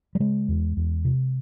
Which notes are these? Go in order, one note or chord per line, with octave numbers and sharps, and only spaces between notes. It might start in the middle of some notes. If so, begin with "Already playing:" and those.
G3
C#3 G#3
E2
E2
C3